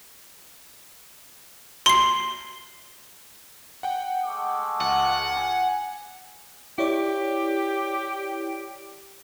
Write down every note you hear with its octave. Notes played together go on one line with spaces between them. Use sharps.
C6 C7 G7
F#5 G5
G#3 A3 D6
C#2 F#5
G#5
E4 G4 C#5 D5